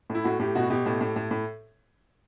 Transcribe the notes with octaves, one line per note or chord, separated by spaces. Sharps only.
A2
E4
A2 F#4
A2 G4
B2 F#4
B2 G4
A2
A2
A2
A2